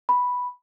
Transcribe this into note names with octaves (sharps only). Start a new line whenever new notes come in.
B5